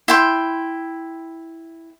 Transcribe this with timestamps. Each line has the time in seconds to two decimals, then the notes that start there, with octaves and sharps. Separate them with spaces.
0.08 E4 G5 C6